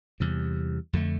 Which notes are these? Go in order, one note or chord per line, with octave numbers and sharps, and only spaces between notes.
E2 C3 G3
F2 D3 A3